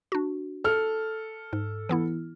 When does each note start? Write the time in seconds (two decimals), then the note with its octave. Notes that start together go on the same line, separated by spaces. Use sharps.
0.12 D4 F#4
0.64 A4 F6
1.53 G#2
1.89 E3 B3 E4